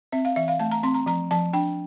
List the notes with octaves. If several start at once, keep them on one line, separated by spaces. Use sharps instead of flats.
C4 E5
F5
E3 E5
F5
A3 A5
A#5
C4 C6
A#5
F3 A#5
F3 A5
D4 G5